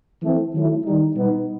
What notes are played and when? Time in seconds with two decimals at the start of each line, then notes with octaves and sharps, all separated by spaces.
0.23 E3 A3 C4
0.54 D#3 F#3 A3 E4
0.85 D#3 G3 D#4
1.15 B2 G3 B3 D#4